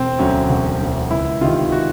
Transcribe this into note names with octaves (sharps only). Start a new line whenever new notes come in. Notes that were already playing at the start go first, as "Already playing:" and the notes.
Already playing: E1 C4
D2 D3 F#3 C#4
E1
D2 D3 F#3
C#2 E4
C3 D#3 F4
F#4